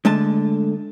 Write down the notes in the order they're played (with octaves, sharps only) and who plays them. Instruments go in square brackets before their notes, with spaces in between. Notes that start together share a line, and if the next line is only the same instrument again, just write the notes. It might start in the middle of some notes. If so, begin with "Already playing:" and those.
[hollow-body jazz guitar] D3 G#3 A3 A5